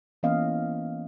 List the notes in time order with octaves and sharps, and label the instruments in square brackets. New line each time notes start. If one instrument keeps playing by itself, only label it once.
[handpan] E3 A#3 B3 C#4 D#5 F5